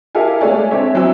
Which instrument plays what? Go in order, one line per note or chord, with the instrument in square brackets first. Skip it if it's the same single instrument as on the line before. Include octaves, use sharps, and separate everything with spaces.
[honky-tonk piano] E4 G4 A4 A#4 F5 G#5
G#3 A3 A4 C#5 D5 G#5
C4 D4 C#5 E5
F#3 C4 E4 G#5 E6